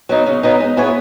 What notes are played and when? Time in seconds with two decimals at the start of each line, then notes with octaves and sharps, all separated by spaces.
0.09 F#3 B3 D#4
0.26 C#3
0.43 F#3 B3 D#4
0.60 G#3
0.77 B3 E4 G#4 C#5